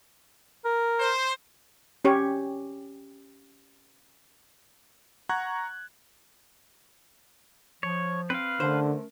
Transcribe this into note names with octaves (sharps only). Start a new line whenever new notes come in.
A#4
C5
C#4 G4 C#5
F#5 A#5 C#6 F#6 G#6
F3 C#5
C4 B4 F5
D3 A3 C#4 A#4 C5